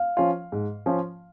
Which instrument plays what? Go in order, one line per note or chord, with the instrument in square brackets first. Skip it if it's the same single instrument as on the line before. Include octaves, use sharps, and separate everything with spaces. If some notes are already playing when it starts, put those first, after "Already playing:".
Already playing: [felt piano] F5
[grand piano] F3 C#4 F4
G#2
F3 C#4 F4